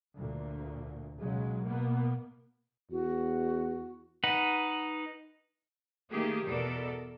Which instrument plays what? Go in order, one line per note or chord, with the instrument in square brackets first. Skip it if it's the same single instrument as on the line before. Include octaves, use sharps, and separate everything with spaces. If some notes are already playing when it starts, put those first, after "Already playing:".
[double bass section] D2 A#2
B1 C#3 F#3 G#3
B2 A#3 B3
[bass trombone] E2 [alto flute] F#4
[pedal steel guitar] D#4 B4 F#5
[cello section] D#3 A3 A#3 G4 G#4
E2 B2 A4 A#4 D5